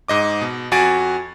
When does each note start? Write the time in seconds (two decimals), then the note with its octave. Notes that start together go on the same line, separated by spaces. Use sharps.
0.08 G#2 D#5 D6
0.41 B2
0.72 F2 F#4 G#5 A6 D7